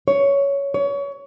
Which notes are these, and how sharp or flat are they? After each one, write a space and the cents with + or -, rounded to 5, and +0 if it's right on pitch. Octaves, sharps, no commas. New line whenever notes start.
C#5 +10
C#5 +25